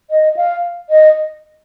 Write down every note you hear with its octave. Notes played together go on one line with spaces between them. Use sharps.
D#5
F5
D#5